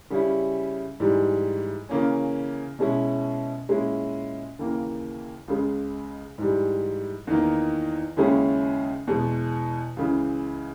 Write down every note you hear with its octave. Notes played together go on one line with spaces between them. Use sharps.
C#3 G3 C#4 E4
G#2 E3 G3
C#3 E3 A#3 C#4
B2 G#3 C#4 E4
A#2 G#3 C#4 E4
D#2 C#3 E3 A#3
C#2 C#3 G#3
G#2 E3 G3
E2 D#3 A#3
D#2 C#3 G#3 C#4 E4
E2 B2 G#3
C#2 C#3 E3